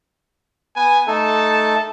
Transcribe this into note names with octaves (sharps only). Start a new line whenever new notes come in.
B3 B4 G#5
A3 D#4 A4 A5